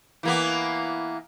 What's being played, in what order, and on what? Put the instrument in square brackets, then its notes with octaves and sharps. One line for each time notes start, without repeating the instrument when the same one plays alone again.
[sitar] E3 A#3 B3